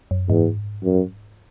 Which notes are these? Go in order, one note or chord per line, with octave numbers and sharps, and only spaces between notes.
F#2
E2 G#2
F#2